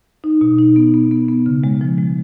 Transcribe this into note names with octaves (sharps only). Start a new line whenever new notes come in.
D#4
B2
D#4
B3
B3
B3
B3
C#3
G#3
F3
G#3